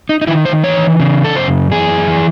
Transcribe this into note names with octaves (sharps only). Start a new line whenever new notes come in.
D#4
D#4
D#3 E4
C5
E3 C#5
C#3
A4
F#2 C5
E3 G#4
E3